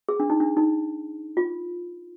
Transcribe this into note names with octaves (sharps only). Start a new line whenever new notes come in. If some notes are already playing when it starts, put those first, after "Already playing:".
G#4
D4
D#4
D4
D#4
F4